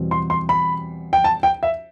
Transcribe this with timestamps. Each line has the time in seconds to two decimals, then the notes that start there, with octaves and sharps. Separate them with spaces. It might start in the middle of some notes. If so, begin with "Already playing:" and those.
Already playing: E2 B2 G3 C4
0.11 C6
0.30 C6
0.49 B5
1.13 G5
1.24 A5
1.43 G5
1.63 E5